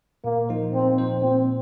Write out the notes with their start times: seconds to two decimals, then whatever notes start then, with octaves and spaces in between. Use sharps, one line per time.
0.24 A#2 A#3
0.49 F3 D#4 C5
0.73 A#2 C4
0.98 F3 D#4 C5
1.22 A#2 C4